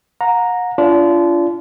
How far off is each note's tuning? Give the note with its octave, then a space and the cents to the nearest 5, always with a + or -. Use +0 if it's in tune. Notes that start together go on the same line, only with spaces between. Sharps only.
F#5 -40 A#5 +0
D4 -30 F4 -30